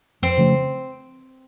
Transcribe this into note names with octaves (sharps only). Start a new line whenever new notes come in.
F2 C4
C#3 F3 A3